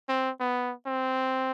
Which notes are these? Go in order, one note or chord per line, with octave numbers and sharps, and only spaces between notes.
C4
B3
C4